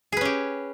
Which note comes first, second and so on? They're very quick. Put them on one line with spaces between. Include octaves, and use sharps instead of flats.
G#4 B4 C#4 G4